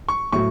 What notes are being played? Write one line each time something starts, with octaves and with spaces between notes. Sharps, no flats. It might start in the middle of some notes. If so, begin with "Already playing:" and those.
C#6
A2 F#3 A3 C#6